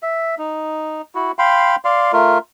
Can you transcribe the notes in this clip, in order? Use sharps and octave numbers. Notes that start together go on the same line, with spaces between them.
E5
D#4
E4 F#4
F5 G5 B5 C6
D5 F5 C6
A3 F4 A#4